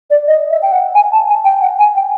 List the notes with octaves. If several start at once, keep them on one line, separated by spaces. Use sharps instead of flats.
D5
D#5
E5
G5
F#5
G#5
A5
G#5
G5
F#5
G#5
G5